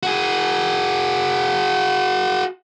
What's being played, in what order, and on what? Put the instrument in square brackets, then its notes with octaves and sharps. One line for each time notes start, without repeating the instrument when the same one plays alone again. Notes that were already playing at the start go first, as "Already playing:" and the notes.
[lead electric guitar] F#4 G#4